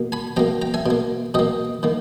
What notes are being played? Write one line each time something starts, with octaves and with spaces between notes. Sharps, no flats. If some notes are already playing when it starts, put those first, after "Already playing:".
Already playing: B2 A#3
G#5 B5
B2 A#3 G5 A#5
G5 A#5
E5 G#5
B2 A#3
B2 A#3 D#5 G5
D#3 A#3